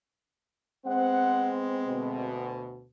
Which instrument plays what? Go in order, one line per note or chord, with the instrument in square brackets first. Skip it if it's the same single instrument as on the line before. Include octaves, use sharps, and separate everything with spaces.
[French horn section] G#3 B3 C4 [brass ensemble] F#5
[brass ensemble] D2 B2